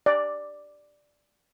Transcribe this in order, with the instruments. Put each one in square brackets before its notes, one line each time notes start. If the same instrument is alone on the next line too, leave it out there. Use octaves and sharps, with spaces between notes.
[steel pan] D5